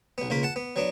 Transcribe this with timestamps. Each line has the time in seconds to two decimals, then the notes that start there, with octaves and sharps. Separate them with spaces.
0.18 B1 B3
0.30 C#2 A#3 F4 B5
0.43 F#5 A5
0.56 B3
0.76 F#3 B3 D4